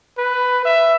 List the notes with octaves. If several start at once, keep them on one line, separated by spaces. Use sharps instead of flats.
B4
E5